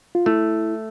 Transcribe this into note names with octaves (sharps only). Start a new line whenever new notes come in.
F4
A3 E4